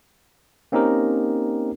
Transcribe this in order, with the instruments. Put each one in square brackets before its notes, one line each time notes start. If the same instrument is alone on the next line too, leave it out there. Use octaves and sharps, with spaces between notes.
[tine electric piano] A#3 C4 C#4 D#4 G4 A#4